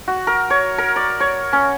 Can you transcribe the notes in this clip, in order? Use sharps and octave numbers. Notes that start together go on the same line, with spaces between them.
F#4
A#4
C#5
A#4
D5
C#5
C#4